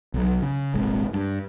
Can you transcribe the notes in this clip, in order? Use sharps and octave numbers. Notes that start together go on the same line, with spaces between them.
B1 F#3
C#3
D#1 G#1 C3 G#3
G2